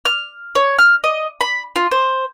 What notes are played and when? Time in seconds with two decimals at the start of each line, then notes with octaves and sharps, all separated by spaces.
0.05 F6
0.55 C#5
0.79 F6
1.04 D#5
1.41 B5
1.76 F4
1.91 C5